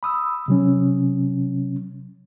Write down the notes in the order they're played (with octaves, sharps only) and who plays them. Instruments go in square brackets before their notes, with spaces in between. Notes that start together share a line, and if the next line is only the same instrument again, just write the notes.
[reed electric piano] B5 D#6 E6
C3 F#3 C#4